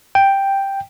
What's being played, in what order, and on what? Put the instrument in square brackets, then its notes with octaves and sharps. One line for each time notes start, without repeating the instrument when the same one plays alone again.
[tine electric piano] G5